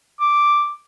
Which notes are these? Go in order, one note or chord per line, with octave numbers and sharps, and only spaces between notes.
D6